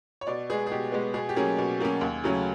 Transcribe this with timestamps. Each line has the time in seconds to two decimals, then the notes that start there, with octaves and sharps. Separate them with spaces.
0.21 C#5
0.27 B2 D5
0.50 G#3 B3 G#4
0.67 G#4
0.72 B2 G4
0.92 G#3 B3
1.14 B2 G#4
1.29 G4
1.36 F#3 A#3 C#4 G#4
1.59 B2
1.81 F#3 A#3 C#4
2.01 D#2
2.24 C#3 F#3 A3 C#4